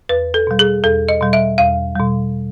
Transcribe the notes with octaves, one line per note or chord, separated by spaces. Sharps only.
E2 B4
A4
B2 G3
G#4
E2 A4
D#5
B2 G3
E5
E2 F5
B2 G3